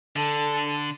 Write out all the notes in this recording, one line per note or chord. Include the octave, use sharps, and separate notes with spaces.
D3 A4